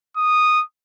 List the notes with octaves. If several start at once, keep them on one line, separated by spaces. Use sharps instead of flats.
D#6